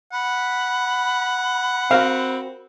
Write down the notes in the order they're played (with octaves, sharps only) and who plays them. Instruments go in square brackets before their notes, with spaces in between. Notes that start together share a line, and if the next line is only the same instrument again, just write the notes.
[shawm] F#5 [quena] B5
[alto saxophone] C4 [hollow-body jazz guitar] F#4 A#4 F5